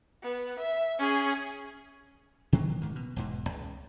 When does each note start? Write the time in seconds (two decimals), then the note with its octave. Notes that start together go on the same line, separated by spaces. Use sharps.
0.23 B3
0.59 E5
0.98 C#4 G#4
2.53 B2 D#3 F#3 A#3
2.81 G#2 D#3
2.96 B2
3.16 E1 G#2 B2
3.50 C#2